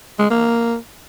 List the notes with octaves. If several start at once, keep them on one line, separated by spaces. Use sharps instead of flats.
G#3
A#3